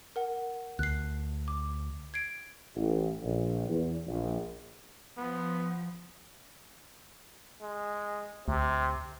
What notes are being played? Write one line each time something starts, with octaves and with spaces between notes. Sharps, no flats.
A#4 F#5
D2 F#6 C7
D6
G#6 C7 D7
A1
A#1
E2
A#1
F3 B3
G#3
D2 C3